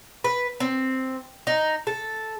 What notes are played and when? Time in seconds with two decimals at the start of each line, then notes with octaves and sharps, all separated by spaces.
0.24 B4
0.60 C4
1.47 D#4
1.87 A4